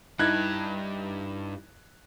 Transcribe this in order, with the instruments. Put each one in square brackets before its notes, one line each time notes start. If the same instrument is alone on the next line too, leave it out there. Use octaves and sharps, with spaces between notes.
[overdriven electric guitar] G2 [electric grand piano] D#4 E4 [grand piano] F#6 G#6